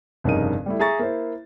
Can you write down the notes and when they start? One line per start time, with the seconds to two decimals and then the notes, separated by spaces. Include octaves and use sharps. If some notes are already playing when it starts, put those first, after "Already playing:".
0.24 F1 G2 C#3 D#4 A#4 D#7
0.66 G3 A3 E4
0.79 G#4 E5 G#5 A#5 C#6 A6
0.99 A#3 E4 C5